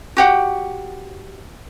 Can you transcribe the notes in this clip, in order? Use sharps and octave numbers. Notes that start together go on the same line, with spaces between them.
F#4 G4 F#5